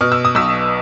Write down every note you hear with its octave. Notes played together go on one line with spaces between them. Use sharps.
B2 F6
E6
D#6
B1 E6